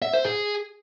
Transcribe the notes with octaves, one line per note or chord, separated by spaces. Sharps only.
E5
C5
G#4